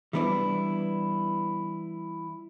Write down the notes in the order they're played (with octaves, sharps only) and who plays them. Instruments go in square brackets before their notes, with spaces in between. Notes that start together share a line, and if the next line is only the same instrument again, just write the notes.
[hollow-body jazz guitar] E3 G3 B3 D4 E4